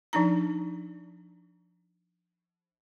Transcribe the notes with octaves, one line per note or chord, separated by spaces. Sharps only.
F3 D4 D#4 A#5